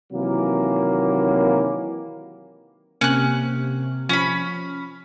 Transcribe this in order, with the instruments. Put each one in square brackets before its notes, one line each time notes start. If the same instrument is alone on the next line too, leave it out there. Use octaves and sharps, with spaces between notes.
[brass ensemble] C3 D#3 E3 F#3 A#3
[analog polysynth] C3 [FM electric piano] A#3 [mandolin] C#4 F#6
[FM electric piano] F3 [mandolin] C#4 B5